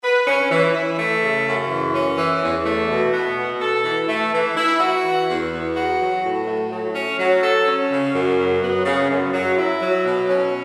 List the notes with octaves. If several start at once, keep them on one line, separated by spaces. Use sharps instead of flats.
B4
C#4
E3
E4
A3
C#3
F#2
E3
C#4
E3
E2
A3
B2
B3
B2
A4
E3
A3
E3
E4
F#4
E3
E2
B3
F#4
F#3
A2
A3
F#3
C#4
F#3
A4
C#4
C#3
F#2
F#3
B3
C#3
F#2
F#3
E4
F#3
B2
C#4